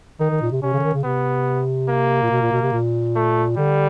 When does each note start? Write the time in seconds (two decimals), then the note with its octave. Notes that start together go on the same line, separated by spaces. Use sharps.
0.20 D#3 D#4
0.31 D#3
0.41 A#2
0.52 C3
0.62 C3 C#4
0.73 C#3
0.79 D3
0.83 D#3
0.94 C#3
1.04 C3 B3
1.89 A#3
2.23 A#2
2.31 B2
2.41 A#2
2.52 B2
2.62 C3
2.72 A#2
3.16 A3
3.57 D3 G3